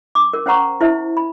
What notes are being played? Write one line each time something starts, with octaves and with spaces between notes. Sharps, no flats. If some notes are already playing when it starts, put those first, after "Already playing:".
D6
A#4
C#4 C5 F#5 A#5 C#6
E4 C5 E5
B5